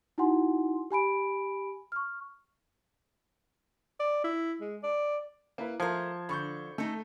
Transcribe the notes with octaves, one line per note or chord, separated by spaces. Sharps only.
D#4 E4 F#4 F#5 G#5 C6
G4 G#5 B5 D7
C#6 F6
D5
E4
G#3
D5
A#3 E4 B4
F3 A3 A#4 A5 C6 G#6
D3 B5 C#6 G6
A3 D#4 A4